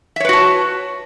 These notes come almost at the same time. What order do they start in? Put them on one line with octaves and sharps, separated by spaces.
E5 C#5 B4 F#4 A5